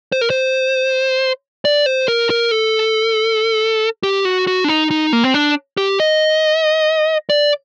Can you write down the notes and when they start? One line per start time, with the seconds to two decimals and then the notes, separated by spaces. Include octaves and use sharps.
0.12 C5
0.21 A#4
0.30 C5
1.65 D5
1.86 C5
2.08 A#4
2.30 A#4
2.51 A4
4.03 G4
4.25 F#4
4.47 F#4
4.64 D4
4.68 D#4
4.91 D#4
5.13 A#3
5.24 C4
5.34 D4
5.77 G4
6.00 D#5
7.30 D5